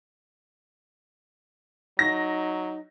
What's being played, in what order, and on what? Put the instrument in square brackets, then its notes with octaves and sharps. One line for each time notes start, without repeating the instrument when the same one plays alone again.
[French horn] F#3 [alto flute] D#4 [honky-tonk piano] A#6